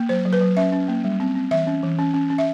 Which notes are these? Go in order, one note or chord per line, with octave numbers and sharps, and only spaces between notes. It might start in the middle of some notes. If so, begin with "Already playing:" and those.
Already playing: A#3
F#3 C5
F#3
B4
F#3
C#4 E5
C#4
A#3
G3
C4
C4
E3 E5
C#4
E3
C#4
C#4
C#4
E5